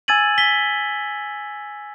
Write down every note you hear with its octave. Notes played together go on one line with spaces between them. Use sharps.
G#5 E6 G#6 A6 D#7 F#7
B6 G7